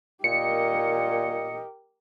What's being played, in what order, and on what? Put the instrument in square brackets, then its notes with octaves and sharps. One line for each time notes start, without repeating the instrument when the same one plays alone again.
[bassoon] A#2 [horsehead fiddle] G4 A#4 [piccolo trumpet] D#5 [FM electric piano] C#7